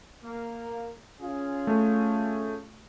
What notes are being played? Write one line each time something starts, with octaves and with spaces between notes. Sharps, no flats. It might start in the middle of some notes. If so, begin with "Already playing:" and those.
A#3
C#4 F4 G#4
A3